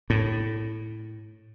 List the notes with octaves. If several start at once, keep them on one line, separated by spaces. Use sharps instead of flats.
A2